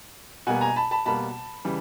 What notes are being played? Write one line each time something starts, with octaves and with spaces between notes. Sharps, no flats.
B2 G3 A#3 F#5 G#5
G#5 A#5
A5 B5
A5 B5
B2 G3 A#3 A5 B5
C#3 E3 G3